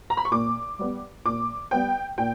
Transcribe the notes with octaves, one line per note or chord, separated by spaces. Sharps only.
A#5
B5
C#6
A#2 D6
G3 B3
A#2 D6
G3 B3 G5
A#2 G5